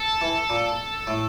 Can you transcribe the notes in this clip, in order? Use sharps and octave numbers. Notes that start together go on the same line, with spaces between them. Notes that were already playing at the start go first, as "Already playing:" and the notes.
Already playing: A4
E3
A#2
A2